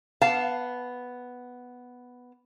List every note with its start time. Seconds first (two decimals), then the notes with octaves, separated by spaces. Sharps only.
0.21 B3 F5 A5